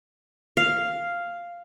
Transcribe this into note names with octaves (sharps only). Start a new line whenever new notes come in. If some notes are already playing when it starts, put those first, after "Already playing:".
F5